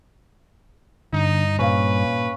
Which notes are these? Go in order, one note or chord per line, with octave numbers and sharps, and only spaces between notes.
G2 D3 D#4
A#2 C#4 B4 F5